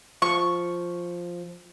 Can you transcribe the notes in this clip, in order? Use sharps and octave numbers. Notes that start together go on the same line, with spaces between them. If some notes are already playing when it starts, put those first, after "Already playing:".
F3 C#6